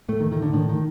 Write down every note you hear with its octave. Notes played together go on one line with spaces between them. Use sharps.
A2 A3
D#3
A2 D#3
D3
A2 D#3
D#3